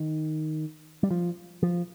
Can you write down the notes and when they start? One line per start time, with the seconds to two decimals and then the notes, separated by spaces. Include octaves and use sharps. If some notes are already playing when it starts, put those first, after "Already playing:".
Already playing: D#3
1.03 G3
1.11 F3
1.63 F3